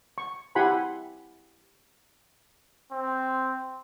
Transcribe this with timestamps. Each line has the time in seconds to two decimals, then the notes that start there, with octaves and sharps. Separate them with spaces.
0.18 C#6
0.55 E4 G4 F#5 G#5 B5 C6
2.92 C4